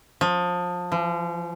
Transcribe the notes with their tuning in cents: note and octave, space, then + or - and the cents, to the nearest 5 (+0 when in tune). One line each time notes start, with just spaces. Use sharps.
F3 +25
F3 -40